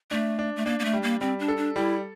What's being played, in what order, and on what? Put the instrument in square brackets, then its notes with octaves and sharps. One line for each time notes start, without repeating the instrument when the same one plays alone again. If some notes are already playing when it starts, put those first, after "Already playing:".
[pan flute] A3 [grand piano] D4
[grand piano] D4
[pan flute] A3
[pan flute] A#3 [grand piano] D4
[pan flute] A#3
A3
[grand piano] G3
[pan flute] A#3
[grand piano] G3 [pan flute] C4
[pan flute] D4
[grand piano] A4
[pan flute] D4
[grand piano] G3 [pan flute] E4